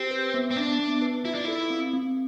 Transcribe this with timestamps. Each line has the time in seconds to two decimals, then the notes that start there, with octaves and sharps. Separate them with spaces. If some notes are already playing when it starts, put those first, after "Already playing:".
Already playing: C4 G4
0.11 B4
0.34 B3
0.51 C4
0.56 B3 D4
0.79 B3
1.02 B4
1.25 E4 F4
1.35 D4
1.45 E4 A4
1.70 C4
1.93 C4